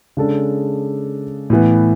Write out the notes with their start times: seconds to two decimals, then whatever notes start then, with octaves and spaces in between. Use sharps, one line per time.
0.17 C#3 G#3 D4 A4
1.50 A2 E3 B3